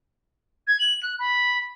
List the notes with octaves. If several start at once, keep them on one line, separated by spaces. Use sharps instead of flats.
G#6
F#7
F#6
B5